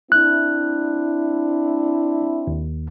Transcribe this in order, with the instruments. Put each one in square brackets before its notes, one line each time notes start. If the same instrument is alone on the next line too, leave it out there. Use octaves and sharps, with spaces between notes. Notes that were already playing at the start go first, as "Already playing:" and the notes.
[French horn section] C4 D4 E4 [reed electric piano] F#6
[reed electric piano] D#2